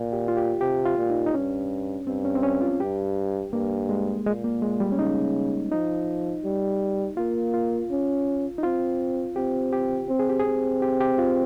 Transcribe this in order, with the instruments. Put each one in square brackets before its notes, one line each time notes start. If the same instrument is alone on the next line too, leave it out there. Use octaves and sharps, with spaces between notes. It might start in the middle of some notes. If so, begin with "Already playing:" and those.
Already playing: [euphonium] A#2
[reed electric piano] G4
F4
G4
[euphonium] C3 [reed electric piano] G4
[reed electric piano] F4
[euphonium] A#2
[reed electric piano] D#4
D#4
[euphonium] G2 [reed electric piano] C#4
[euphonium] G2 [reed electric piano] C4
[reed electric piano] C#4
C4
C#4
F4
[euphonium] G2 [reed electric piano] G4
[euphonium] G2 [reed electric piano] A#3
[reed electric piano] G#3
[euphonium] A#2 [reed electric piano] G#3
[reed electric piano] A#3
G#3
G3
C#4
[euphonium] C#3 [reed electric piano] D#4
[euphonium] F3 [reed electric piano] D#4
[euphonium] G3
[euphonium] A#3 [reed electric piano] F4
[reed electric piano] F4
[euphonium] C#4
[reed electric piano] D#4
[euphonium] C4 [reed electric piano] F4
[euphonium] C4 [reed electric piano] G4
[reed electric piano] G4
[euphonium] C4
[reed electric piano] G#4
G4
G#4
[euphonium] C4
[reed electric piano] G4
G4
F4